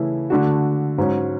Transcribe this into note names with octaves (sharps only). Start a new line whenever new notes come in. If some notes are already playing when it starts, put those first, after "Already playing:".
Already playing: C#3 E3 A3 E4
D3 A3 D4 F#4
G#2 F#3 C#4